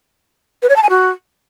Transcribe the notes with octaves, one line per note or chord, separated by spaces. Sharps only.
B4
C#5
A5
G#5
F#4